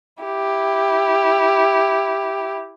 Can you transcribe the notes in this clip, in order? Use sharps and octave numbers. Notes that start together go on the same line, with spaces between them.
E4 G4